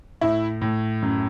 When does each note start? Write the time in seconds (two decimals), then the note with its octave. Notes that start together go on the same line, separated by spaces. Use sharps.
0.21 A2 E4
0.61 A2
1.02 F#2